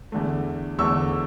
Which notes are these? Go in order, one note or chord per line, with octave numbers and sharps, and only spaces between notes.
E2 D3 A3
E2 D3 A3 C#6 E6